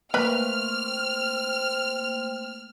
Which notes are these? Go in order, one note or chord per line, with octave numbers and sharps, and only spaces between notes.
A3 A#3 C4 A#4 B4 B5 F6